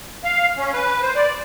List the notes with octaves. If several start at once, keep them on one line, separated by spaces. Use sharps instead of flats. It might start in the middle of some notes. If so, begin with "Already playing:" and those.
F5
C#4
B4
C5
D5